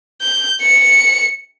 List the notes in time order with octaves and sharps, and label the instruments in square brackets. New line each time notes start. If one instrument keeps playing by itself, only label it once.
[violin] G6
C#7